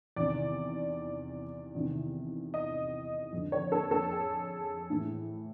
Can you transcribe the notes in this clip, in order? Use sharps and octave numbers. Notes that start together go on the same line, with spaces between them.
E2 C3 D#3 D5
E2 C3 D#3
D#5
F2 D3
C#5
A4
A4
G#4
A2 E3